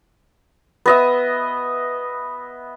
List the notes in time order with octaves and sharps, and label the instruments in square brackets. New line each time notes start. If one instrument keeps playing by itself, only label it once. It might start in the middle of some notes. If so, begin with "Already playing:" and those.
[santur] B3 D#5 E5